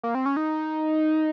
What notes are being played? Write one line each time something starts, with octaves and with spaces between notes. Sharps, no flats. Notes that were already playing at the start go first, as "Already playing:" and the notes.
A#3
C4
C#4
D#4